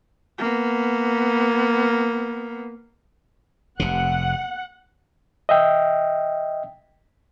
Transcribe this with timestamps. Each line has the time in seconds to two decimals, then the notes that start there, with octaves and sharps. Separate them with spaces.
0.38 A#3 B3
3.80 F1 C3 F#5
5.49 D#5 E5 G5